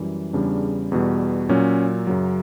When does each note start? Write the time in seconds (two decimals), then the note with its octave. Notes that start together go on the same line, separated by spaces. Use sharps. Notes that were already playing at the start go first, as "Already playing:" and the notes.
Already playing: F#2 E3 G3
0.33 E2 C#3 G3 D4
0.92 E2 B2 G3
1.49 A#2 F#3 C#4
2.07 F#2 C#3 F#3